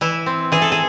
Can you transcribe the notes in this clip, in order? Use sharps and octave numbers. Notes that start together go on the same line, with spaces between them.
E3 E4
C4
E3 G#4
A4
G#4